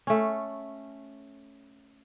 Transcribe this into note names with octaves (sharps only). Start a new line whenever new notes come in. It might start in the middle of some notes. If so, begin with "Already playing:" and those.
A3 C#4